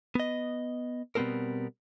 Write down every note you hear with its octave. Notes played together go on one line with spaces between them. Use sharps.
B3 D#5
B2 G3 B3 C4 A4 A#4